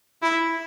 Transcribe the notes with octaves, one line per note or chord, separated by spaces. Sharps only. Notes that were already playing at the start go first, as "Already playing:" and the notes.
E4